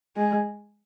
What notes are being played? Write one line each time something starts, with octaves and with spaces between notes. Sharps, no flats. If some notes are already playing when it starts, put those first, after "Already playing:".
G#3